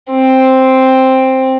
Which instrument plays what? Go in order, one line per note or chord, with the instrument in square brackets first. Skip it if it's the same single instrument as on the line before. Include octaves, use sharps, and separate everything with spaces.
[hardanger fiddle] C4